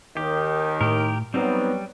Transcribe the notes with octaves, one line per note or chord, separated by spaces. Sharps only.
D#2 D#3 G4
A2 G4 A#4
F#3 G3 B3 C4 D#4 C5